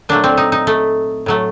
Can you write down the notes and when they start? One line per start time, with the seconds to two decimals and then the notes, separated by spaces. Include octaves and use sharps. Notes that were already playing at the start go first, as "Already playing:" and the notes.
0.09 A#2 F#3 A3 D4
0.24 C4
0.37 D#4
0.52 D#4
0.67 A3
1.26 A2 F#3 A3